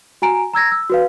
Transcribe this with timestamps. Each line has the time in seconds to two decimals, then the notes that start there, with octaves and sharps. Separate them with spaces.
0.22 F#4 G#5 A#5 D7
0.53 A#5 E6 G#6 A#6
0.72 E6
0.90 F#4 B4 F5